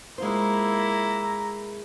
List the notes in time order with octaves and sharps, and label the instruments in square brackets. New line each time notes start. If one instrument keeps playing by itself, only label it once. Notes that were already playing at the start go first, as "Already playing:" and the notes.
[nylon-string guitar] G#3 F4 C5 [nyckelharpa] A#3 E4 [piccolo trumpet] A#5